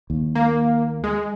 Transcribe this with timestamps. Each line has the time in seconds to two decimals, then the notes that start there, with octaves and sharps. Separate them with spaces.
0.10 D#2
0.35 A#3
1.04 G#3